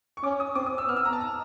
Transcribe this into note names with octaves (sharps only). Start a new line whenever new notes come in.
C#6
C#4 D6
D#6
C4 D6
D#6
E6
B3 F6
E6
A#5
A5
A#5